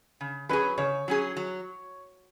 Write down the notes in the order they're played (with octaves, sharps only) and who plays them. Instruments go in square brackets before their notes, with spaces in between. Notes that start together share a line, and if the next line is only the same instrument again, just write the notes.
[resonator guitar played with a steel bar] C#3
[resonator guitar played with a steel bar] F#3 C#4 G#4 [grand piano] B4
[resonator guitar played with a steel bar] C#3 [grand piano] C#5
[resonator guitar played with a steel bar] F#3 C#4 G#4
F#3